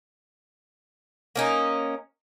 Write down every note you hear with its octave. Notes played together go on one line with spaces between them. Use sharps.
A#3 C#4 D#4